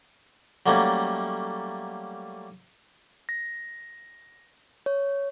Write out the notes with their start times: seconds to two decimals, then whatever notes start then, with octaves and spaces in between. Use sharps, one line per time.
0.66 F#3 G3 A3 A#3 C#4
3.29 A#6
4.86 C#5